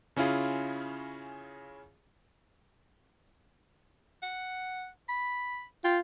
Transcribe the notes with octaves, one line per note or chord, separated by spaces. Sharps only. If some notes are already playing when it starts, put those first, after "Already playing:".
C#3 C#4 E4 F4 G#4
F#5
B5
F4 G5